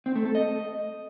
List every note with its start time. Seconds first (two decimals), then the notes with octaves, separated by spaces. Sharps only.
0.06 C4
0.16 A3
0.25 A4
0.35 D#5